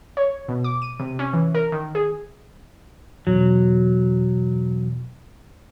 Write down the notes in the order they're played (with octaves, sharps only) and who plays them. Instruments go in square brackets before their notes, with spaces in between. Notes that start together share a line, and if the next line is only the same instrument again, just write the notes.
[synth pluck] C#5
B2
D6
D#7
C3
C#4
E3
A#4
D#3
G#4
[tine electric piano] E2 B2 E3 [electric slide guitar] F#3